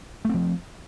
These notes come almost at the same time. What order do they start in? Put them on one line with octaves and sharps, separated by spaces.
A3 C4 F3